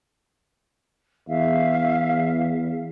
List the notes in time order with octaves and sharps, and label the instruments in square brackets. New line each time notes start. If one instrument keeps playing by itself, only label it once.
[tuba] E2 [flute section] E5 F5